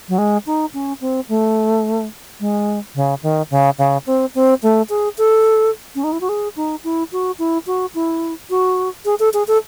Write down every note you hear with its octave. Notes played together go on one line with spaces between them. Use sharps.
F#3
G#3
D#4
C#4
C4
A3
G#3
C#3
D#3
C#3
C#3
C4
C4
A3
G#4
A4
C#4
D#4
E4
F#4
G#4
D#4
E4
F#4
E4
F#4
E4
F#4
G#4
A4
G#4
A4